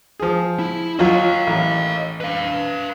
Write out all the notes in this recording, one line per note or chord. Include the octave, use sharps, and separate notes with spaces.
F3 G#4
E4
F#3 F4 D#5 F5
A1
B4 F5